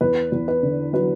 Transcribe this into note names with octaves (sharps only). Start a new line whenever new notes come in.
E2 B4
E2
B4
D3
F#3 B4